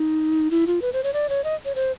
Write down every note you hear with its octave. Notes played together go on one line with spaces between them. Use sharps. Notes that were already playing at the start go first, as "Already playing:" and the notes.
Already playing: D#4
E4
F4
B4
C5
C#5
D5
C#5
D#5
C#5
C5